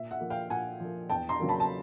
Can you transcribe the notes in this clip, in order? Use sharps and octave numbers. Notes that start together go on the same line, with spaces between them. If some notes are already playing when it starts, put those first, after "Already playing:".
Already playing: A#2 E5
E5 F#5
F3 A#3
F5 G5
A#2 F#5 G#5
F3 A#3
E2 G5 A5
A#5 C6
C#3 F#3 A#3
A5 B5
A5